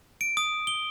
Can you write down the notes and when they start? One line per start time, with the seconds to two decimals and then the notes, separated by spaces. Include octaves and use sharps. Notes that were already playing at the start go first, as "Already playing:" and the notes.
0.21 D7
0.37 D#6
0.67 G7